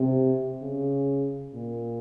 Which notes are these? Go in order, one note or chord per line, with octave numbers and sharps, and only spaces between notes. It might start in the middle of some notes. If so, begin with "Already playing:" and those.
Already playing: C3
C#3
A#2